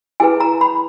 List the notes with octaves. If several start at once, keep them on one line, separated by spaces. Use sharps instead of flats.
E4 G#4 B4 G#5
A#5
B5